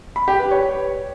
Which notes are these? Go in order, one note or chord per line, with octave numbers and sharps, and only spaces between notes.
B5
G4
B4
C#5